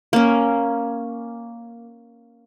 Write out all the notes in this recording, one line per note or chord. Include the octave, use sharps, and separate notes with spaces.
A#3 C#4